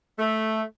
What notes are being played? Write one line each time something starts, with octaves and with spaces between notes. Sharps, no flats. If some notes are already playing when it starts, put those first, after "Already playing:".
A3